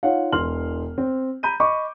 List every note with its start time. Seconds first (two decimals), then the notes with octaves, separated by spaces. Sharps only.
0.03 D#4 F4 C#5 F5 F#5
0.32 E1 E3 C6 F6 F#7
0.98 C4
1.43 A#5 B5 G6 D#7
1.60 D#5 B5 C#6 D6